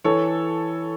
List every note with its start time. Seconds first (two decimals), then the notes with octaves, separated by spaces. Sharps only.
0.04 E3 A4 C#5